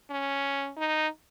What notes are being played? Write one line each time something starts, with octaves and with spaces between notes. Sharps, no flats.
C#4
D#4